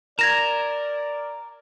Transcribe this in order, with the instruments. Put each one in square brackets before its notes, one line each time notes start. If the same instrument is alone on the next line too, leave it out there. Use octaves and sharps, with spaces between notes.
[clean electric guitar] A#4 [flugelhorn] D5 [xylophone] G#6 A#6 E7